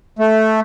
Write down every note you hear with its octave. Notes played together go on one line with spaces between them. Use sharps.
A3